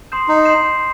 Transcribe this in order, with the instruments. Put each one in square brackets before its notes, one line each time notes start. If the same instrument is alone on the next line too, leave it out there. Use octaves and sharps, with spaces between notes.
[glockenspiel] C6 D#6 G6 C7 E7
[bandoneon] D#4
[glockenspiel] C6 D#6 G6 C7 E7